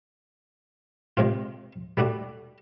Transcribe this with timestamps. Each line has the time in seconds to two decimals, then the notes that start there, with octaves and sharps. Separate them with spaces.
1.17 C3 G#3 C4 F4
1.97 G3 A3 D4 F#4